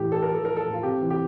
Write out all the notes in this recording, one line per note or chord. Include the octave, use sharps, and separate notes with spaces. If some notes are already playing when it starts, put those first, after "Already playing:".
Already playing: A2 E3 G4
A2 A4
A#4
F3 A4
F3 A#4
A4
A2
F4
C3 G4
E3
G4